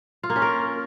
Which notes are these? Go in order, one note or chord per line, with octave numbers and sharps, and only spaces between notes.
F4
A#3
C#4
A#4